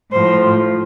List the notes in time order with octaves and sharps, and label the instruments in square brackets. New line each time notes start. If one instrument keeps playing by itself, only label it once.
[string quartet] A2 F3 C5